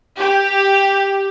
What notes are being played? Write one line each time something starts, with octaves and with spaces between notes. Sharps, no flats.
G4